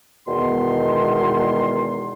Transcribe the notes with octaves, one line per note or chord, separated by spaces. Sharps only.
E2 B2 D#3 G#3 C6